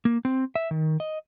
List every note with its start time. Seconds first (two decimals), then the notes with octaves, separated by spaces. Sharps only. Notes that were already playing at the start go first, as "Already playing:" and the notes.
0.05 A#3
0.25 C4
0.55 E5
0.71 D#3
1.00 D#5